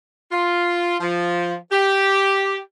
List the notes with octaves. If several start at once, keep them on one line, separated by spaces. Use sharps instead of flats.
F4
F3
G4